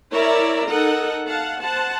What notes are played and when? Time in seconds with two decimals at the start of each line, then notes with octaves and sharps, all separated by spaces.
0.10 E4 A#4 C#5 D5 E5 A#5
0.66 D#4 A4 A#4 D#5 F#5
1.27 F5 F#5 A5
1.60 C5 F#5 A5